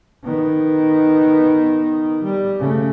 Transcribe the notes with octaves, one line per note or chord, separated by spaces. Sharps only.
D#3 B3
G3
C#3 A3